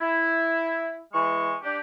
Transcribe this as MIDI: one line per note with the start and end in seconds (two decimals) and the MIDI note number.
0.01 1.00 64
1.14 1.56 52
1.14 1.56 56
1.14 1.56 85
1.63 1.80 62
1.63 1.80 67